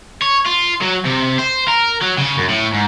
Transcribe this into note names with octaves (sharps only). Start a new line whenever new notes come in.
C#5
F4
F#3
C3
C5
A#4
F#3
C#3
F#2
A2
G#2